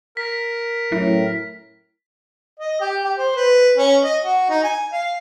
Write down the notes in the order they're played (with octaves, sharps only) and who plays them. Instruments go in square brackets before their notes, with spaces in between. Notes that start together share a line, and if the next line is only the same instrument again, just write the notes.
[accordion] A#4 [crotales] B6
[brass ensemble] F#2 A2 [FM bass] E4
[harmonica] D#5
G4
G4
C5
B4
C#4
D#5
F#4
D#4
G#5
F5